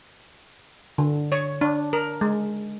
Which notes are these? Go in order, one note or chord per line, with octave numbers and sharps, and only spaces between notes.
D3
C#5
D4
A#4
G#3